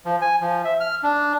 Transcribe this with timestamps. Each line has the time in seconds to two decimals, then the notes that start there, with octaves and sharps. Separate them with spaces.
0.06 F3
0.22 G#5
0.41 F3
0.65 E5
0.80 F6
1.03 D4